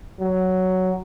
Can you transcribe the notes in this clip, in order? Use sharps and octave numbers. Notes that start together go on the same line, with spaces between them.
F#3